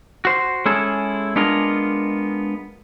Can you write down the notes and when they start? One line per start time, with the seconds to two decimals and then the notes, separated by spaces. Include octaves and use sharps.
0.25 F#4 C5
0.66 G#3 C#4 E4 G#4 A4
1.36 G#3 B3 D4 F4 G#4 A#4